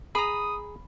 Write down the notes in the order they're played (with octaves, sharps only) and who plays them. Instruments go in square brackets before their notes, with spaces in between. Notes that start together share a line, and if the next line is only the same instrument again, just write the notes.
[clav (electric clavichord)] G#4 A#5 [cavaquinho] B5 [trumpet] D#6